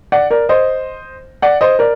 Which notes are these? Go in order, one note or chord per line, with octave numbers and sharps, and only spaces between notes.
D5 F#5
A#4 D5
C5 D#5
D5 F#5
C5 D#5
A#4 D5